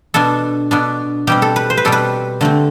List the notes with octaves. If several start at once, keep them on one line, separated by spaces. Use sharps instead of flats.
B2 B3 D4 A4
B2 B3 D4
B2 G3 C4 G4
A4
B4
C5
B4
B2 G3 C4 A4
B4
D3 A3 C4